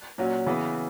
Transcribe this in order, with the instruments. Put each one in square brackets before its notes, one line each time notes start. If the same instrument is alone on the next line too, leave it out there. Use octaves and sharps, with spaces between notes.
[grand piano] A#2 F#3 C#4 F#4
C#3 E3 B3